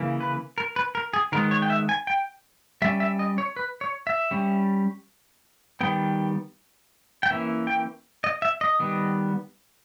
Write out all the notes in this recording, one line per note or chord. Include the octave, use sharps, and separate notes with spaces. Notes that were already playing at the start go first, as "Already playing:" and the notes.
Already playing: C#3 E3 A#3
B4
A#4
B4
A#4
G#4
D#3 G#3 B3 A#4
C#5
G5
E5
G#5
G5
G3 C#4 E5
E5
D#5
C#5
B4
C#5
E5
G3 C#4
D#3 G3 B3 G5
G5
E3 A#3 C#4 E5
G5
D#5
E5
D#5
D#3 G3 B3